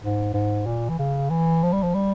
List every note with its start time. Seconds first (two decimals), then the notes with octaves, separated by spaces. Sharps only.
0.02 G#2
0.34 G#2
0.66 A#2
0.89 E3
0.99 C#3
1.30 E3
1.63 F3
1.73 G3
1.83 F3
1.95 G3